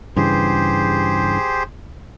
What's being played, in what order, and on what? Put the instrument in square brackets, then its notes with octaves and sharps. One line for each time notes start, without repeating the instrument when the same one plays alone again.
[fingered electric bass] G2 C#3 E3 [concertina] G4 G#4 C5